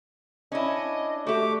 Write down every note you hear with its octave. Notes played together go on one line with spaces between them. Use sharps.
C#4 D4 E4 D#5
A3 F#4 G4 D6